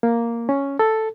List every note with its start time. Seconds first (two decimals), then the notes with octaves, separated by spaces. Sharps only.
0.03 A#3
0.49 C#4
0.79 A4